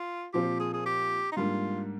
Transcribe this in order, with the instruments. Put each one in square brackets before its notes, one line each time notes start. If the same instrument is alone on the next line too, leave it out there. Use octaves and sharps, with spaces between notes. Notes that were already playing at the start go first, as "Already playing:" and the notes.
Already playing: [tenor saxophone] F4
[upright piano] A#2 F3 C4 F4 [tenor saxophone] G4
[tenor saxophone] G#4
G#4
G4
D#4
[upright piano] G#2 G3 A#3 D4 [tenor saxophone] F4